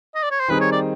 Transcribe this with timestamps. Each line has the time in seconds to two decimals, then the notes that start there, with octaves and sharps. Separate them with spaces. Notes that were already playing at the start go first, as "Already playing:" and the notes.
0.15 D#5
0.23 D5
0.31 C#5
0.40 C5
0.48 D#3 G3 C4 D#4 G#4 B4
0.60 C#5
0.71 D5